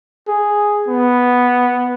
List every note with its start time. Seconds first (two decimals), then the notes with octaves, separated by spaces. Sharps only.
0.28 G#4
0.88 B3